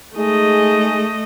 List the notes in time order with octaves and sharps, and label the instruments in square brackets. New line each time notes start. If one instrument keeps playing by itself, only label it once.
[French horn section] G#3 D#4 G#4 [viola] A3 D#5